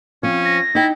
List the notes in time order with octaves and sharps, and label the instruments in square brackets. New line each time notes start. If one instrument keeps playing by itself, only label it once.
[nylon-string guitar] F3 C4 [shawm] C#4
[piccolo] A#6
[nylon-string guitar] D#4 G5 [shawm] E4